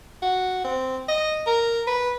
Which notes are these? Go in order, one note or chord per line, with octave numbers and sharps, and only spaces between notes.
F#4
C4
D#5
A#4
B4